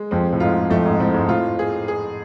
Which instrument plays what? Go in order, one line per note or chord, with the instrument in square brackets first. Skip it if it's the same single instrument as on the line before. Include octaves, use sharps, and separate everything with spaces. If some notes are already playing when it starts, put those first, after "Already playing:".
Already playing: [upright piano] G#3
[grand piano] F2 [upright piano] C4
[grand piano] A2
[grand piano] G#2 [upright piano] F4
[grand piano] F2 [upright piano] A3
[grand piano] G#2
[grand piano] A2 [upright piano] C4
[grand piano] G#2
[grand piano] A2 [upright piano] F4
[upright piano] G#4
G#4